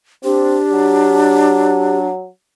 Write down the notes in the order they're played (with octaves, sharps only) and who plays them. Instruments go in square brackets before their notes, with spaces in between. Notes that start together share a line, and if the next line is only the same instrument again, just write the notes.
[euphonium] C4 [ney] D4 [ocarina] G4
[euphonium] F#3